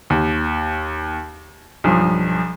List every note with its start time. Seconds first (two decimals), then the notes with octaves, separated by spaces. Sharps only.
0.10 D#2
1.84 B1 G2 F3